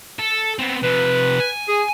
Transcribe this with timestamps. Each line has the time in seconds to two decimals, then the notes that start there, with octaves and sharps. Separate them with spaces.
0.19 A4
0.59 B3 C4
0.83 C3 F3 B4
1.40 G#5
1.68 G#4